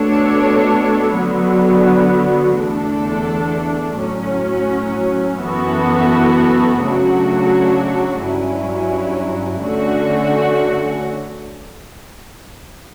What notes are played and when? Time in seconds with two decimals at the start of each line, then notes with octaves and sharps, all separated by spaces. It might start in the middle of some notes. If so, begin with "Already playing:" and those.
Already playing: B2 A3 D4 A4 C#5
1.15 D3 F#3 B3 F#4
2.57 E2 D3 A3 D4 A4
3.98 A2 F#3 C#4
5.40 F#2 E3 B3 F#4 A4
6.82 C#3 F#3 A3 D4 F#4
8.23 G2 F#3 C#4 E4
9.65 D3 A3 C#4 F#4